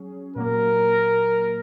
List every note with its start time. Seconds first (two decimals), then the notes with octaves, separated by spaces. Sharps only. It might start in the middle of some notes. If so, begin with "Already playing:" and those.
Already playing: F#3 C#4 G#4
0.36 A#2 F#3 A#3 A#4